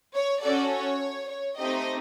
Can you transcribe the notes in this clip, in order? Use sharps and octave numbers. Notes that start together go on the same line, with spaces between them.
C#5
C#4 F#4 A4 D5
C#5
C#5
A3 C4 D#4 G4 D#5